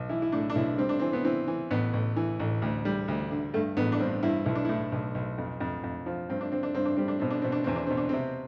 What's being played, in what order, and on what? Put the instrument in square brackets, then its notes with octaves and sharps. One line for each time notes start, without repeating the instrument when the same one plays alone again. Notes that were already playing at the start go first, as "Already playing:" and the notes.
Already playing: [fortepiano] B1
E3 E4
E4
A2 D4
D4
B1 E4
G3 C4
D4
E3 C4
B3
E3 C4
E3
A1 B3
A1
E3
A1
D2
G3
D2
D3
G2 A3
A1 B3
D4
G2 C4
G2 E4
B1 E4
D4
A2 E4
B1
B1
F2
F2
F2
F3
G2 C4
D4
D3 C4
D4
G2 C4
D4
G3 C4
D4
B2 C4
D4
B2 C4
D4
E2 C4
D4
B2 C4
D4
C3 C4